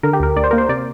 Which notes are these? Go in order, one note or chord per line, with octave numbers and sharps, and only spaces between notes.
D3 A#4
G4
D2 A#4
D2 D5
C5
A#3 A#4
C5
C3 D5